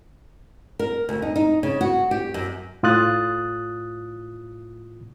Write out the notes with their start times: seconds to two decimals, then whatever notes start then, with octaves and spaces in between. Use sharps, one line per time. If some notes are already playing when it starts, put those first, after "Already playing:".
0.79 A#4
1.09 D2
1.22 D#4
1.36 D#4
1.63 C#3
1.81 F#4
2.11 G4
2.34 F#2
2.83 A2 F4 D#6 F#6 A6